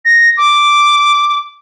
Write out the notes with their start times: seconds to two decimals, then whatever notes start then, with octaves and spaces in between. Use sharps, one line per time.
0.05 A#6
0.37 D6